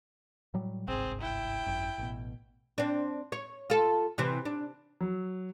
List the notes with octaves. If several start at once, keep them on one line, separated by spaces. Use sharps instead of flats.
A2 F#3 G3
G1 C2 G#2 C4 G#4
E4 G5
G#1 F#2
A1 B2
C4 D4
C#5
F4 A4
C3 E3 C4
D4
F#3